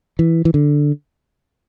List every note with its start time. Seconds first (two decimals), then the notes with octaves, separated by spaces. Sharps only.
0.19 E3
0.45 E3
0.54 D3